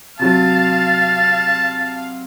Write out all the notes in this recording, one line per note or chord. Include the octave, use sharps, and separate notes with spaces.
C3 F#3 F5 A5 A6